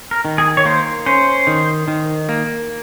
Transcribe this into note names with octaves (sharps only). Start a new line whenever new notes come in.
A#4
D#3
G#4
C#5
A#3 C5
C#4 C5
D#3
D#3
A#3